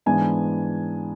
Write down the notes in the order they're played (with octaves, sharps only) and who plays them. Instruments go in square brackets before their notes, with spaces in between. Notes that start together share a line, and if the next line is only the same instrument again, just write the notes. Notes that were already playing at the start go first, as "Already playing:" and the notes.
[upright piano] G#2 E3 B3 D4 G#5